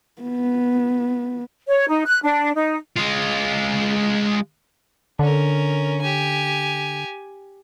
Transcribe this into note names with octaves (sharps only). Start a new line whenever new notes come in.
B3
C#5
D#4
F#6
D4
D#4
G#3 F4
D3 C#4 A#4
G4 G#5